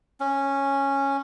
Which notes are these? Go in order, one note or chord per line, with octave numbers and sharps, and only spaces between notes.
C#4